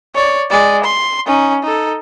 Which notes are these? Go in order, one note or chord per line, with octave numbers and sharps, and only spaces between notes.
C#5 D5
G#3 D5
C6
C#4 D#4
D#4 A4